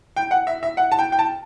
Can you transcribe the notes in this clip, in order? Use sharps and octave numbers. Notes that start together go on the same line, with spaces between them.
G5
F#5
E5
E5
F#5
A5
G5
G5
A5